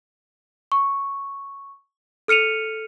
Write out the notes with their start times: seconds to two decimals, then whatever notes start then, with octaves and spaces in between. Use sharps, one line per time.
0.72 C#6
2.28 A4 F6 C#7 D#7 F7